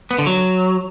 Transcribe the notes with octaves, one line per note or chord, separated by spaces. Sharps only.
B3
D3
F#3